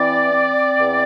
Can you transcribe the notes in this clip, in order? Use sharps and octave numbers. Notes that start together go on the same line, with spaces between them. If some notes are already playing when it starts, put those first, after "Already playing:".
Already playing: E3 C4 D5
C4
E2